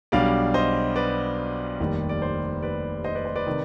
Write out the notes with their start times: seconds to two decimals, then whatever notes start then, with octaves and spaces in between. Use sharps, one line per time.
0.12 B1 B2 G3 D4 D5 F5
0.54 C5 D#5
0.96 B4 D5
1.80 F1 D#2 D#3 G3
2.09 D5
2.22 C5
2.63 B4 D5
3.04 C5 D#5
3.15 B4 D5
3.25 C5
3.36 B4 D5
3.46 C3 D#3